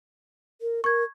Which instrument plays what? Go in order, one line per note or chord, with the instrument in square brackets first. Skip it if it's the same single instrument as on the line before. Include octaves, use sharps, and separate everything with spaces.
[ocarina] A#4
[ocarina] A#4 [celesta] C#6 G#6